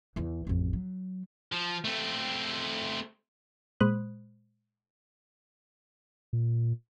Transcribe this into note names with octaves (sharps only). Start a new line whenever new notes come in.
E2 E3
A1 F2
F#3
F3
A3 C4
A#2 G#3 C5 B5 D#6 F#6
A#2